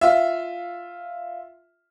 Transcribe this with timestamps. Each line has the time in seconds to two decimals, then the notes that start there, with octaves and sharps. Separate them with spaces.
0.01 F4 E5